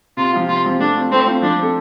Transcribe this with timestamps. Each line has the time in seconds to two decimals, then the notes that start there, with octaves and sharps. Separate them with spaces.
0.17 C3 F4
0.33 F3 C4 F4
0.48 C3 F4
0.65 F3 C4 F4
0.80 A3 D4
0.95 C4 F4 C5
1.11 A3 C4
1.26 C4 F4 C5
1.42 F3 D4
1.58 C4 A4